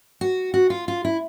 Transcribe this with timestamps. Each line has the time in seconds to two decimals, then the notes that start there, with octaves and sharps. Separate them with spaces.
0.21 F#4
0.54 F#4
0.70 F4
0.88 F4
1.05 E4